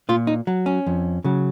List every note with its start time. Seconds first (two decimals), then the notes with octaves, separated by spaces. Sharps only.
0.09 A#2 F4
0.27 D#4
0.47 F#3
0.66 C#4
0.87 F2
1.24 C#3 F#3